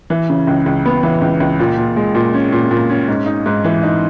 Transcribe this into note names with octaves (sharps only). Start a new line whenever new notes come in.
E3
C#3
C#2
C#2
B3
E3
C#2
C#2
A#2
A#2
G#3
A#2
C#4
A#2
A#2
C#4
G#2
D#4
G#2
E3
D#4